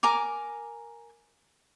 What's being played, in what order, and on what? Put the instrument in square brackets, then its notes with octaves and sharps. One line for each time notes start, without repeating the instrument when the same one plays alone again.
[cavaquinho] A#4 G#5 A#5 D6